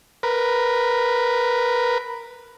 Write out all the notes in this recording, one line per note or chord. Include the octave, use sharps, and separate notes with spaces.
A#4 B4